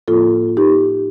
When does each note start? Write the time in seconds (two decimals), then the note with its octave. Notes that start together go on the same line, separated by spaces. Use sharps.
0.08 A2 F3 A#3 F4 A4
0.57 D#4 G4